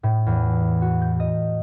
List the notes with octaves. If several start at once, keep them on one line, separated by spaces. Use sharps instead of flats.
A2
E2
F#4
G6
D#5